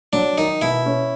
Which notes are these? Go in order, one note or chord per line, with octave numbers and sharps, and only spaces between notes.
F#3 D4
D#3 D#4
B2 E4
C#4